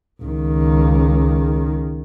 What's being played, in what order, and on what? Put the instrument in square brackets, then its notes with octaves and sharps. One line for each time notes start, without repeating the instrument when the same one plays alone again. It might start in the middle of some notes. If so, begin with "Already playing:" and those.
[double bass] C#2 D#3